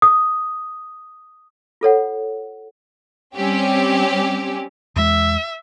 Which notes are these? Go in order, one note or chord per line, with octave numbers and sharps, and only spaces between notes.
D#6
F4 A4 C#5 F#5
G3 C4 C#4 G4
E2 G#3 E5